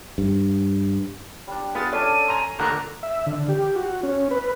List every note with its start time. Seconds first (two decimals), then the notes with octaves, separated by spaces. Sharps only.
0.18 G2
1.47 G3 D4
1.75 B3 F4 G#4 A6
1.93 C#4 D4 A4 D#7
2.28 G#5 A#5 C6
2.59 A#1 D3 A3 A#3 A#5 F#6
3.03 E5
3.26 D3
3.49 G4
3.76 F#4
4.03 C#4
4.31 B4